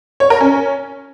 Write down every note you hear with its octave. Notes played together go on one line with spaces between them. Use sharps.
C#5
A#4
C#4